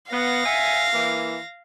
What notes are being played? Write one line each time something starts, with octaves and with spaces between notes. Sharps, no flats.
B3 F5 A#6
E5 F#5 G#5
E3 A#3